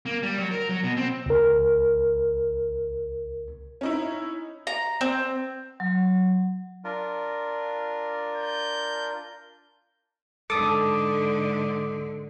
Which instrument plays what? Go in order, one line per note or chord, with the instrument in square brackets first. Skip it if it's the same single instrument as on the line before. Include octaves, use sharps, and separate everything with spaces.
[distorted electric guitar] A#3
G3
F#3
A#4
F#3
B2
C4
[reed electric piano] C#2 A#4
[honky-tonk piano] C#4 D#4 E4
[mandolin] A#5
C4
[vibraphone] F#3
[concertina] D4 F4 A#4
[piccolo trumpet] G6
[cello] G#2 D3 [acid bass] A4 [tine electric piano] D6 D#6